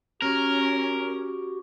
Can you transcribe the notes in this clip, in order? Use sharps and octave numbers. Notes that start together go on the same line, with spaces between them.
C#4 F#4 G4 A#4